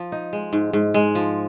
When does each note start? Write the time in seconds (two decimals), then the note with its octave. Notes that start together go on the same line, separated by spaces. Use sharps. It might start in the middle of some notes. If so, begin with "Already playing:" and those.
Already playing: F3
0.12 D#4
0.33 G#3
0.53 G#2
0.73 G#2
0.94 G#3
1.15 F3